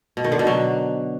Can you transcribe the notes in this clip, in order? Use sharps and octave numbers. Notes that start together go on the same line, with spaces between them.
B2
D#3
D3
B2
F#3